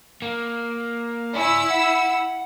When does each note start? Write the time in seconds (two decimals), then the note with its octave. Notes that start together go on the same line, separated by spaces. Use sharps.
0.22 A#3
1.36 E4 D5 G#5 E6
1.70 F#5